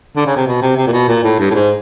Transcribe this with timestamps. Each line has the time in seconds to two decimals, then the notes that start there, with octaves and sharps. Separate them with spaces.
0.16 D3
0.26 C#3
0.36 C3
0.47 B2
0.62 C3
0.77 C3
0.87 A#2
0.93 B2
1.08 A#2
1.24 A2
1.40 G2
1.51 A2
1.55 G#2